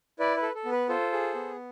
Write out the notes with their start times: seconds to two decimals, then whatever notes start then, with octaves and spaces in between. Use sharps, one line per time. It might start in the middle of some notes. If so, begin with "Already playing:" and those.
0.19 E4 B4 D5
0.37 B4
0.43 A4
0.55 A4
0.65 B3
0.72 B4
0.89 F4 A4 C5
1.12 G#4
1.35 B3